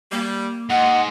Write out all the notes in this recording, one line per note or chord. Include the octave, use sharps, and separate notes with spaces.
G3 A#3
G#2 G#3 D#5 F#5